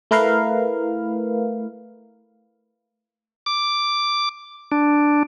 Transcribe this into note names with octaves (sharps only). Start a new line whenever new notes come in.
A3 E4 A#4 B4 F5
D6
D4